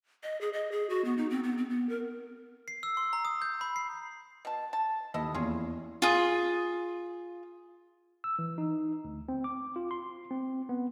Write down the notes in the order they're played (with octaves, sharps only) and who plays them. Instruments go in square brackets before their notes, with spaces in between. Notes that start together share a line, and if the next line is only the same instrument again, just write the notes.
[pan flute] D#5
G#4
D#5
G#4
F#4
B3
D#4
C4
B3
C4
B3
A#4
[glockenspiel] C7
E6
C6
A#5
D#6
G6
B5
C7
[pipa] B2 A5
A5
[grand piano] D#2 [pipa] E4 A4 D#5
[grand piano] E2 [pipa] C#4 F4 G#4
[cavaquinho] F4 G#4
[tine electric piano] E6
E3
D#4
D2
C4
D6
F4
C6
C4
B3